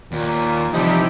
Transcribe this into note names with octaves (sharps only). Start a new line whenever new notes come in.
D#2 A#2
C3 E3 F3 G3 D#4 E4 G4